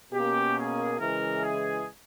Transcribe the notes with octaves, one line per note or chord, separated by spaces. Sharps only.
B2 A#3 C#4 G4
G#4
C#3 E3 G#3 A#4
G#4